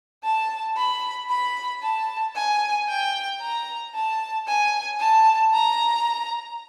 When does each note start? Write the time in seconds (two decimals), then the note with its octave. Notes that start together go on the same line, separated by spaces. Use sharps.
0.24 A5
0.76 B5
1.29 B5
1.82 A5
2.35 G#5
2.88 G5
3.41 A#5
3.94 A5
4.47 G#5
5.00 A5
5.53 A#5